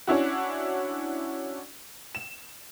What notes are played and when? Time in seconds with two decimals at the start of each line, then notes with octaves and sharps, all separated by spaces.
0.07 C#4 D4 E4 F#4
2.15 E7